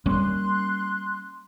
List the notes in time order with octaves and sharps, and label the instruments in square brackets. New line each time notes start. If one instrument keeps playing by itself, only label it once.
[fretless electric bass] G3 A#3 C#4 [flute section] C6 F#6